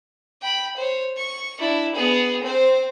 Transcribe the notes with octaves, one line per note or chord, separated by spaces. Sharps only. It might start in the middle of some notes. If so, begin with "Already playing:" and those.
G5 B5
C5 C#5
C#6
D4 E4
B3 G#4
C4 C5